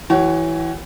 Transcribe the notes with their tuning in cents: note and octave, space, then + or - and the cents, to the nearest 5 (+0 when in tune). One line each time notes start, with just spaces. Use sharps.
E3 +0 F#4 +40 C#5 +0